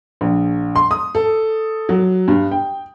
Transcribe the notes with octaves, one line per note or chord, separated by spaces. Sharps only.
A#1
C6
D#6
A4
F#3
G2
G5